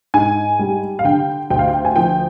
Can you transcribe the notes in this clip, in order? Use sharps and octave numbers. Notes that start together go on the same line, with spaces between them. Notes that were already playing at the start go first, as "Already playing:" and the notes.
G#2 G#5
G3
F5
D3 G5
D2 G5
F5
G5
G#5
F3 G5